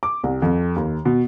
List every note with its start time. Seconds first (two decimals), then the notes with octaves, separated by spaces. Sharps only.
0.03 D6
0.23 C2
0.42 F2
0.76 D#2
1.05 B2